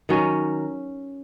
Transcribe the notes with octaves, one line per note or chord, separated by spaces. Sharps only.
D#3 F#3 C#4